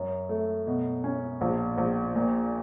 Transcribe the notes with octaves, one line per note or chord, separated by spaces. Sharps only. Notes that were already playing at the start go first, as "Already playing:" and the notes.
Already playing: F#2
A3
B2
C#4
A#1
A#1
A#2